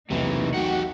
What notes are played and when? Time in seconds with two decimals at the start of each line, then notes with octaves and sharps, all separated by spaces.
0.10 B1 E2 C3 E3 A3 A#3 D#4
0.54 F#4 G4 F#5